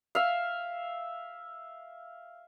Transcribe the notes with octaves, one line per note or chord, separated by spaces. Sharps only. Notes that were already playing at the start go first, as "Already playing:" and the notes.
E5 F5